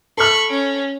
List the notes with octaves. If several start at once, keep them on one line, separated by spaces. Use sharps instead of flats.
A4 B5 C#6 F6
C#4